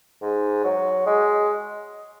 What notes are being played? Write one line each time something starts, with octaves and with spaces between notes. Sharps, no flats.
G#2
F#3
G#3